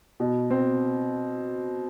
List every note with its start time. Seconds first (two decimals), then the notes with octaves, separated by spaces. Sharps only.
0.20 B2
0.50 C4